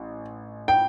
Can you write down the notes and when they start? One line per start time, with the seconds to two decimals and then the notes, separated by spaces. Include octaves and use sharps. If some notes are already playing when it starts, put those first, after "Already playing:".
Already playing: A1
0.68 G5